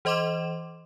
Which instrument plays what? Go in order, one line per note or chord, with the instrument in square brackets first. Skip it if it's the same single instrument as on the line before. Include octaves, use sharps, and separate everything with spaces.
[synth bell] E3 C5 D#5 C6 D6 E7